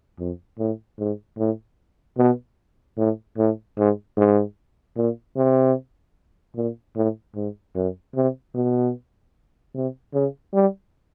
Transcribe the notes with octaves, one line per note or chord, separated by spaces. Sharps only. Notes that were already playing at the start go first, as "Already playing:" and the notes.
F2
A2
G#2
A2
B2
A2
A2
G#2
G#2
A#2
C3
A#2
A2
G#2
F#2
C3
B2
C3
C#3
G3